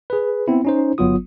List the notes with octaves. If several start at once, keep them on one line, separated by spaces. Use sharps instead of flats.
G#4 B4
B3 C4 E4
C#4 D#4 C5
G1 F#3 B3 F4 D#6